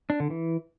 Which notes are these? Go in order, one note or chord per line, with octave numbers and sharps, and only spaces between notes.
D4
D3
E3